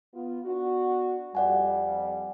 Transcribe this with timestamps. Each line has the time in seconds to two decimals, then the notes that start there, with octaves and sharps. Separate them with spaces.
0.14 B3 F4
0.45 B3 D4 F#4
1.35 F2 G3 D5 F#5 G#5